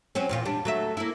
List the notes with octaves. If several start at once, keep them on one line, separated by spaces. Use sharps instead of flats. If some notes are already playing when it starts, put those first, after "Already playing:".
F#3 C4 C#4
E2 A#2 F4
G3 D4
F#3 A3 E5
A#3 E4